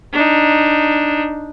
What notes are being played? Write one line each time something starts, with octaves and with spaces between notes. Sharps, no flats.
D4 D#4